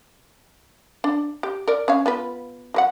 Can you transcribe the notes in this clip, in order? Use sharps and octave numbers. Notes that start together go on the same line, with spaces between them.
D4
G4
A#4 D5
C#4 C#5 F5
B3 F4 B4
F#3 B4 F#5